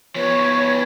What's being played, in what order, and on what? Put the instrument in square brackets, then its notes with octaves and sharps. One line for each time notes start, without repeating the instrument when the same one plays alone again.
[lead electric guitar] F3 B3 [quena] C#5